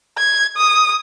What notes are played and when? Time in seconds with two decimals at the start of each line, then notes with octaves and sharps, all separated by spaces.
0.18 G#6
0.57 D#6